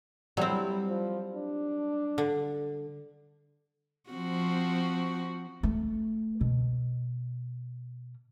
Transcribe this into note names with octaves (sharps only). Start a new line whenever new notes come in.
F#3 G3 C4 E4
F3
D4
D3
F3 C4 F#4
A3
B2